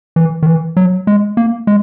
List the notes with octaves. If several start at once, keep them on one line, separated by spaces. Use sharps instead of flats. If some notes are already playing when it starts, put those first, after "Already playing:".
E3
D#3
E3
F#3
G#3
A#3
G#3